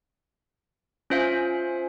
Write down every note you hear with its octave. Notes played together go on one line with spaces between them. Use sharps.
C#4 F4 C5 E5 F5 G#5